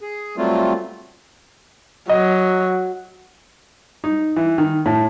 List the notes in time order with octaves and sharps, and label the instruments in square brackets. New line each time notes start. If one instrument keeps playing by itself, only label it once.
[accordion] G#4
F#3 G3 A3 C4 F4
[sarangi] F#3 [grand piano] D#5
[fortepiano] D#4
E3
D#3
A2